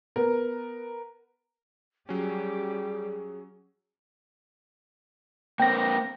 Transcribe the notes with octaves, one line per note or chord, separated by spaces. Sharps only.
B3 A#4
F#3 G3 C#4 G4 G#4
A#3 C4 G5 A#6